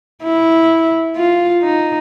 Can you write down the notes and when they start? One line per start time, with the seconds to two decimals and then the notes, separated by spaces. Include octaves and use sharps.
0.23 E4
1.16 F4
1.63 D#4